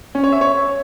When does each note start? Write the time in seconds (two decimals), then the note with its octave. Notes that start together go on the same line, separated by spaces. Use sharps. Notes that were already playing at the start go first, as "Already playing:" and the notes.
0.15 C#4
0.24 C#5
0.32 E5
0.41 C#5